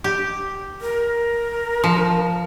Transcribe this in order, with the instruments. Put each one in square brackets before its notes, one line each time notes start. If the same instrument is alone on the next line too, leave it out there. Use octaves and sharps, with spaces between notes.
[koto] G4
[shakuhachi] A#4
[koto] F3